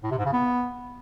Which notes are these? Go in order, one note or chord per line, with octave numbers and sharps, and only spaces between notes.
A2
C3
G#2
C#3
B3